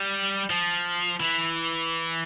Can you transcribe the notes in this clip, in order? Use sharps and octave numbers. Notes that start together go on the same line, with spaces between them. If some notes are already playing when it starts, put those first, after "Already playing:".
Already playing: G3
F3
E3